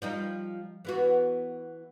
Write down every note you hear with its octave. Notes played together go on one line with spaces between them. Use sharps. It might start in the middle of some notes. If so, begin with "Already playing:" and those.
F3 G3 D#4
E3 B3 F#4